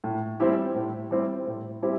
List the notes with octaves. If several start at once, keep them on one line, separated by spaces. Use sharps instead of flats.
A2
G3 C4 E4 G4
A2
G3 C4 E4 G4
A2
G3 C4 E4 G4